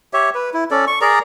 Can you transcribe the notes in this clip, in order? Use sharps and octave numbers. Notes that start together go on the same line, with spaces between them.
G4 C#5 E5
B4
E4
C#4 A4 D5
C#6
G#4 A#4 D5 A#5